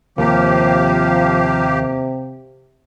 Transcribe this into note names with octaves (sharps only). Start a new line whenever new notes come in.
D#2 C3 F3 A#3 G4